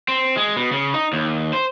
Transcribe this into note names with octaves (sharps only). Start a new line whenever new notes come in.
C4
G#3
B2
C#3
D#4
D#2
C5